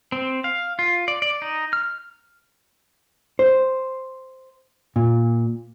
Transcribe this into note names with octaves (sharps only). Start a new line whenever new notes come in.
C4
F5
F4
D5
D5
D#4
F6
C5
A#2